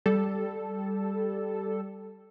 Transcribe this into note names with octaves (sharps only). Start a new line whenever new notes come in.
G3 A4